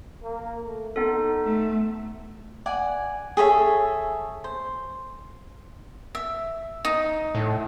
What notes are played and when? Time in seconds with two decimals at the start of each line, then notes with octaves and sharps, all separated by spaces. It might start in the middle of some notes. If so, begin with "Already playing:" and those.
0.23 A#3
0.65 A3
0.96 B3 D#4 A4
1.44 A3
2.66 D5 F#5 G#5
3.37 G#4 A4 C#5 E5
4.44 C5
6.15 E5
6.85 D#4
7.35 A2